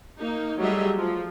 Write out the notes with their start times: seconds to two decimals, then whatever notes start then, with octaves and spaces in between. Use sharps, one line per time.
0.20 A#3 D#4
0.59 F#3 G3 A3 G#4 D#5 E5
0.97 F3